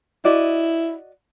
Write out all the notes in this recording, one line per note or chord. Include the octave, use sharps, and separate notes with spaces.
E4 F#4 D5 D#5